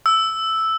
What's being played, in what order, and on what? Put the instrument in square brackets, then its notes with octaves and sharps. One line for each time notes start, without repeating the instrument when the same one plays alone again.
[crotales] E6